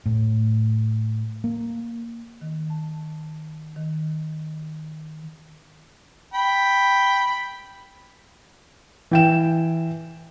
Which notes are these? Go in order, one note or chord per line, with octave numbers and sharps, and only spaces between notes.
A2
A#3
D#3
A5
D#3
G5 B5
E3 G5 E7